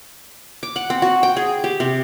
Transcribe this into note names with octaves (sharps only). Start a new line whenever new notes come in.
D6
F#5
C4
F#4
G5
G#4
G4
C3